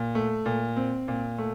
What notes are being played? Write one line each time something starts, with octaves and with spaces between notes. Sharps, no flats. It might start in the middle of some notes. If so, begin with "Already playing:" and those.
Already playing: A#2
A3
A#2
C4
A#2
A3